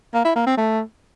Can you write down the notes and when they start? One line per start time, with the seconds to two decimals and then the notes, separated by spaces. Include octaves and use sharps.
0.14 A#3
0.25 E4
0.36 A#3
0.47 C4
0.58 A3